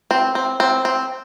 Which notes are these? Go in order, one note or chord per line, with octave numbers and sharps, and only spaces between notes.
C4
C4
C4
C4